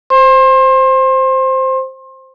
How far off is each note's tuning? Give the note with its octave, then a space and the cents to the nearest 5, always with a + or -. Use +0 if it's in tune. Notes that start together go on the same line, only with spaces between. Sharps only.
C5 +0 C6 +30